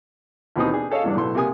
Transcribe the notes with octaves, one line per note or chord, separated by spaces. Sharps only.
D#2 B2 E3 C4 D#4 D#6
D4 G#4
G#4 A4 C#5 D#5 F5
E2 G2 D4
B1 A2 A4 C6
C3 A#3 G#5 D#6